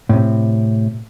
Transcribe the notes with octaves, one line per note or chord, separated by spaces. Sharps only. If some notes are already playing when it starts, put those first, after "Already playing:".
A2 C3